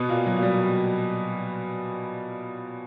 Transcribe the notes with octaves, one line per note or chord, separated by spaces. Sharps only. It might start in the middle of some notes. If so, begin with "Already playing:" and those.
Already playing: B2 B3
A#2 A#3
F#3
A#3
G3